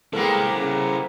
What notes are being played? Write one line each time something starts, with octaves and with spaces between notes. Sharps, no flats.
C3 G#3 A#3 B3 E4 A4 C5
C#3